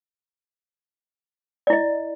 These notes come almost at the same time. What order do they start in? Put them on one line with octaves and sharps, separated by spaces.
D5 E4 D#5